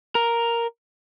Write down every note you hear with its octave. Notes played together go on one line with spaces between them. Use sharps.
A#4